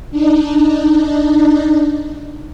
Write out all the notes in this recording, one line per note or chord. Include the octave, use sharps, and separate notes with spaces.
D4 D#4